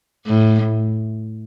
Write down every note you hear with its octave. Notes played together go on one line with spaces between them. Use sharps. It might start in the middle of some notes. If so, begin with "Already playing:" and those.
A2